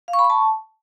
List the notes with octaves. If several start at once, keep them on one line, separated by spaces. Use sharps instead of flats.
F5
C#6
B5
C#6
A5